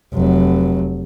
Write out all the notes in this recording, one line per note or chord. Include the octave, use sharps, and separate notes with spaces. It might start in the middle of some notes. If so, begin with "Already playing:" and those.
F1 F#3